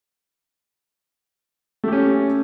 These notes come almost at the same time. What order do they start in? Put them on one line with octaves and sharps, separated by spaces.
A3 G4 C#4